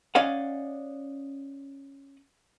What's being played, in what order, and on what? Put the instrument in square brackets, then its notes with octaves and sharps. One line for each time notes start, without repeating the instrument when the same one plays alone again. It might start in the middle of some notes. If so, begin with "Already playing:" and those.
[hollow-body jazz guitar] C#4 D5 D#5 F5 F#5